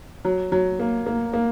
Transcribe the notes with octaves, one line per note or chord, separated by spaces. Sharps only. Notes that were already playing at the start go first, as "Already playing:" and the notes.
F#3
F#3
A#3
A#3
A#3